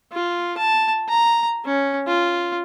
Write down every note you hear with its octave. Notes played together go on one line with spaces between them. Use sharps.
F4
A5
A#5
C#4
F4